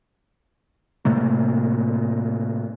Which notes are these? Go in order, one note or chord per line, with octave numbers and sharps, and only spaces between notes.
A2 C3 A3 A#3